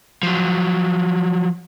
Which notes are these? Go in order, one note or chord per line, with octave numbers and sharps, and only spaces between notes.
F3 F#3